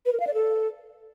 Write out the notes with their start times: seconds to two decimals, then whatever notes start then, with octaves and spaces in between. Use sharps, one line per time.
0.06 B4
0.13 A#4
0.20 F5
0.27 D5
0.34 A4